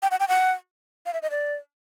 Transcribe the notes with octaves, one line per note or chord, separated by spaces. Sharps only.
G5
F#5
G5
F#5
F5
E5
D#5
D5